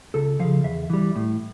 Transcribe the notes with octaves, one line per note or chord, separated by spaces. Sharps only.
C#2 A4
C#3 F3 F5
E2 E5
E3 G3
A2